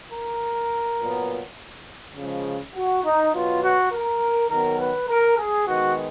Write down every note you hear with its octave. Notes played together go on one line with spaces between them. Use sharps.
A#4
A#2 F#3 B3
C#3 F3 G#3
F#4
D#4
B2 F#3 B3 F4
F#4
A#4
D#3 F#3 B3 A#4
B4
A#4
G#4
D#3 G#3 B3 F#4